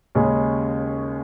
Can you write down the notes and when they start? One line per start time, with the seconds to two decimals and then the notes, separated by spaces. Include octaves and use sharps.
0.15 D#2 C#3 G#3 C#4 G#4